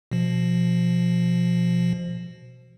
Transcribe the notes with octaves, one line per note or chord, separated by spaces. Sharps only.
B2 F3